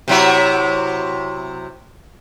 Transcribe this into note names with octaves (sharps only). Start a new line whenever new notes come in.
C3 F#3 E4